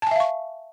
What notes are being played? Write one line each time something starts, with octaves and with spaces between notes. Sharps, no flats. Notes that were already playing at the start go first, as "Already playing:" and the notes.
E5 F5 G#5 A5 C#6